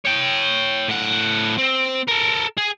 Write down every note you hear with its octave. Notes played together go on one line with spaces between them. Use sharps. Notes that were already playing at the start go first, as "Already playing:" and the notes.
C#5 G5
A2 F#5
C4
A4 A#4
G#4